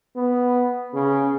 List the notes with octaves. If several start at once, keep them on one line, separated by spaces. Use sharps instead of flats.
B3
C#3